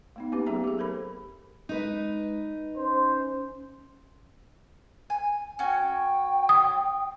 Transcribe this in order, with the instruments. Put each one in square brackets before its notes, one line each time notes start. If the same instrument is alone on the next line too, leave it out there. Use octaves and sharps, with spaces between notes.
[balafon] A3 B3 D#4
A#3 C4 C#4 D#4 G4 B4
F#3 A3 B3 G#4 E5 A#5
G4 G#4
A4 A#4 C5 B5
[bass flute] G#3 [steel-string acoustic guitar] D#4 B4
[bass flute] C#4 [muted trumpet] C5
[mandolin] G#5
[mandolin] C#4 F#4 [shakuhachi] G5
[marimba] D#6